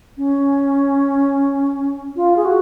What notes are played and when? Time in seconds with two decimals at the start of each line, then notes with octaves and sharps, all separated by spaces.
0.18 C#4
2.16 F4
2.36 G#4
2.45 F#4